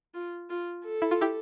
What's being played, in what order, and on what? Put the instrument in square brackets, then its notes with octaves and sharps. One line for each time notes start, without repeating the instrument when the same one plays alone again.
[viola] F4
F4
A4
[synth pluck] E4
F4
E4 G4